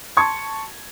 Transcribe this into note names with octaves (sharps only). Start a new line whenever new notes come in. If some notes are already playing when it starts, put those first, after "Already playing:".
A5 C6 C#6 G#6